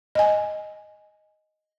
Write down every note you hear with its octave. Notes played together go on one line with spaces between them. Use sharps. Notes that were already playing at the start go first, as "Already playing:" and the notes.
D#5 G#5